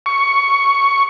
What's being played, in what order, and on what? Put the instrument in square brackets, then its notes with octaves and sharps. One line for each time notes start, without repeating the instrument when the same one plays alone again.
[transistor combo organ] C#6